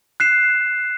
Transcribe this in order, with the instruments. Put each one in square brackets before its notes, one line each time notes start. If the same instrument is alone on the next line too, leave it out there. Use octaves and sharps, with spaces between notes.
[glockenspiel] F#6 C7 E7